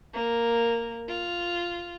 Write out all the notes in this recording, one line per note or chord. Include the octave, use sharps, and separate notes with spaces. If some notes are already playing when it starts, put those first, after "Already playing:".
A#3
F4